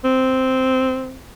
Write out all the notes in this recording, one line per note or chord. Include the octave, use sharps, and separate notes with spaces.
C4